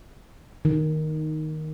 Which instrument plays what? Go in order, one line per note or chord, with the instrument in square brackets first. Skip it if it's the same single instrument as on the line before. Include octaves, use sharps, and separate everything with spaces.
[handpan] D#3